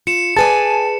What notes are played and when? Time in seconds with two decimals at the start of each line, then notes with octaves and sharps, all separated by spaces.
0.07 F4 C#7 E7
0.37 G#4 B4 D5 G#5 A5